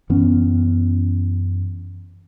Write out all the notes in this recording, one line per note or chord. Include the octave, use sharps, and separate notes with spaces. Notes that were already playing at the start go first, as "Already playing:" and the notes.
F#2 E3 B3 C#4